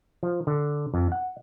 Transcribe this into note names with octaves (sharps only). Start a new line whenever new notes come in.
F3
D3
F2
F#5